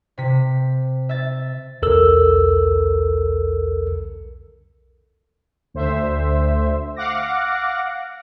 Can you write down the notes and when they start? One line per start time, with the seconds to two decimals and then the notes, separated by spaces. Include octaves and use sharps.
0.18 C3 B6
1.09 E5 A6
1.82 B1 E2 A4 A#4 E6
5.74 D2 C5 E5
6.96 F5 F#5 D6 A#6